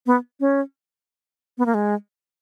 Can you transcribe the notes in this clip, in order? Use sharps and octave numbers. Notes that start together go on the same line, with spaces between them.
B3
C#4
B3
A#3
G#3